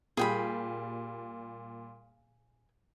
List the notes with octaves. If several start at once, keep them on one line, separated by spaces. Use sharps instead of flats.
A#2 G3 G#4 G5 B5